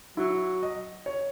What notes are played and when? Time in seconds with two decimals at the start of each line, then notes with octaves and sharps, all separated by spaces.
0.17 F#3 E4
0.63 D#5
1.06 C#5